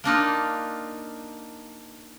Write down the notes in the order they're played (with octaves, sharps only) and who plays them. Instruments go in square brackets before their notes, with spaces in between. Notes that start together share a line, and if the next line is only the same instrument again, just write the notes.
[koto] A#3 D4 D#4 F4